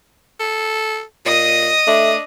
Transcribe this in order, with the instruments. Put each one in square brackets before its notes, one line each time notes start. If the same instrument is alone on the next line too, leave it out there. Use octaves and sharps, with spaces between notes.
[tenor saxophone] A4
[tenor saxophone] A#2 [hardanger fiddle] D#5 D#6
[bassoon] A3 [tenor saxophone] D4